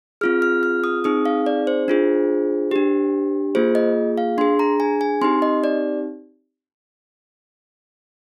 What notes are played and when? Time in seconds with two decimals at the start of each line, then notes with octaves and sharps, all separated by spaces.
0.21 C4 F4 G#4 F6
0.42 F6
0.63 F6
0.84 D#6
1.04 C4 D#4 G#4 D#6
1.26 F5
1.46 D5
1.67 C5
1.88 D4 F4 G#4
2.71 D4 G4
3.55 A#3 F4 G#4 C5
3.75 D#5
4.18 F5
4.38 D4 G#4 C6
4.59 A#5
4.80 G#5
5.01 G#5
5.21 C4 D#4 G4 C6
5.42 D#5
5.64 D5